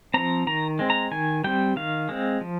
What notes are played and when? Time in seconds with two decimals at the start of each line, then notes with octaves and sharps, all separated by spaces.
0.14 F3 C4 A#5
0.47 D#3 A#5
0.79 G#3 C4
0.90 A#5
1.11 D#3 G#5
1.44 G3 C4 G5
1.76 D#3 F5
2.09 G#3 C4
2.41 F3